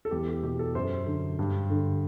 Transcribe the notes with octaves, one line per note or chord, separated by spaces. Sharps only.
A4
E2 G4
G4
B2 G4
A4
F#2 C5
D3
G2
D3